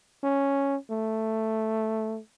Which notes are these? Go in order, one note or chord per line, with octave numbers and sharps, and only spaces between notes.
C#4
A3